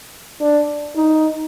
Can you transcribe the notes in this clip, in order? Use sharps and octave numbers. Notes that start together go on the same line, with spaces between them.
D4
D#4